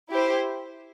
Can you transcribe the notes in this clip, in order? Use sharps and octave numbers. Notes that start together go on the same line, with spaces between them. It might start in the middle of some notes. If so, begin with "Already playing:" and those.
E4 G4 C5